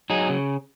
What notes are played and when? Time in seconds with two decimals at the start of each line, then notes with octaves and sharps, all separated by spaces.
0.10 F#3 D#4 G#4
0.29 C#3